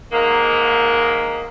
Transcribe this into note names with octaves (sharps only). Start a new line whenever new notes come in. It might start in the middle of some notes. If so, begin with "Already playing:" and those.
G#2 D#3 A#3